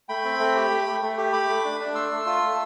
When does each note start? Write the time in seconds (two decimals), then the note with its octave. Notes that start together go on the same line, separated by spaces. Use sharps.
0.09 A3 G5 B5
0.24 C4
0.39 A3
0.56 G4
0.70 A3
0.86 A3
1.02 A3
1.18 G4
1.33 A3 B5 D6
1.49 A3
1.65 D4
1.80 D4
1.95 A3 C6 E6
2.12 A3
2.26 F4
2.42 A3